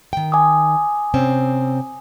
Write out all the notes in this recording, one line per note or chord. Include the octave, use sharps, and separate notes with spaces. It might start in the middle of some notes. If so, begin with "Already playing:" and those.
D#3 G5
G#5 D6 D#6
C3 C4 C#4